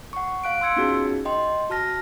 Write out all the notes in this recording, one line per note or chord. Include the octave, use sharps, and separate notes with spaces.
F#5 C#6
F5 F#6 D7
C6 E6 G#6 C#7
B3 C#4 D#4 F4 F#4 G#4
D#5 G5 C6
F#4 A5 F6 A#6